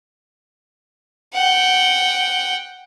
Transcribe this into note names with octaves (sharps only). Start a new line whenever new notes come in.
F#5 G5